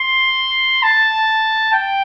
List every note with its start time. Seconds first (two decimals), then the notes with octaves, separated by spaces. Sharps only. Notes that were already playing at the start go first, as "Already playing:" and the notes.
Already playing: C6
0.83 A5
1.73 G5